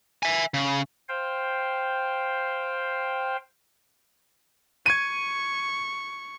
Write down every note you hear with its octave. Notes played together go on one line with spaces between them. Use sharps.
E5 G#5
C#3
C5 F5 G5
C#6 G#6 D#7